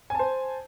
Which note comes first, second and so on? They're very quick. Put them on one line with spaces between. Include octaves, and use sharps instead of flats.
G#5 A5 C5